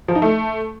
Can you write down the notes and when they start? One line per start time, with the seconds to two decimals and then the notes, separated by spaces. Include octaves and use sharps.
0.08 F3
0.15 D#4
0.22 A3